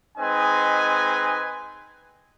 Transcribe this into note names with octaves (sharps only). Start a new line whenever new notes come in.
G#3 C4 D#4 B4 D#5 G#5